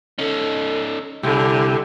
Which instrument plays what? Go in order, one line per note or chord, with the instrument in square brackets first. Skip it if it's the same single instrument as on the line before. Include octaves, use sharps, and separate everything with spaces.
[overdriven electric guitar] C#4 D#4 [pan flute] A4
[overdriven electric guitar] C2 [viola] D3 [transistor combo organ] E4 G4 [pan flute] G#5